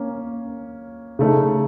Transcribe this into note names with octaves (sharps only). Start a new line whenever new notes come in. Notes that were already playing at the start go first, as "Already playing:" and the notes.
Already playing: A#3 C#4
C#3 A3 D#4